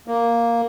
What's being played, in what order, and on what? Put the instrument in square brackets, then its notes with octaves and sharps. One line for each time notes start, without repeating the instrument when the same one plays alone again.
[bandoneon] A#3